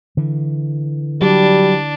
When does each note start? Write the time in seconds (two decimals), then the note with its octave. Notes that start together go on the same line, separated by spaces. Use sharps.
0.17 D3 E3
1.21 F#3 G3 D4